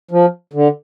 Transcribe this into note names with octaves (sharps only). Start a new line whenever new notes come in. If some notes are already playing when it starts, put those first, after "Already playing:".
F3
D3